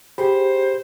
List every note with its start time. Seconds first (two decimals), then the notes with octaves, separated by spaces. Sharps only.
0.18 G4 G#4 C5 B5